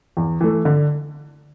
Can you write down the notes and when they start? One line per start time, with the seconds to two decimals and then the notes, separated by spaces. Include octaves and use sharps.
0.17 E2
0.41 E3 A3
0.65 D3